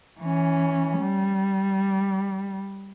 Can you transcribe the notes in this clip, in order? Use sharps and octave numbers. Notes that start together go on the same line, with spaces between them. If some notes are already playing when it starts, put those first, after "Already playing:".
E3 C#4
G3